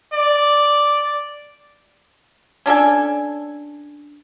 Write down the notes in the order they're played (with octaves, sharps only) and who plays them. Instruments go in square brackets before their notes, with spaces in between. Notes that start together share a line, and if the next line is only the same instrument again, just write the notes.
[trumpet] D5
[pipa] C#4 D4 A4 G#5